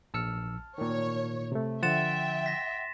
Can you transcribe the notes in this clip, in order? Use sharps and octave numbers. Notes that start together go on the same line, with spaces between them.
A#1 A5 E6 F6 C#7
A#2 D#3 C#5
C3 A3
D3 F3 E5 F#5 G5 C6 A6 E7
A#6 B6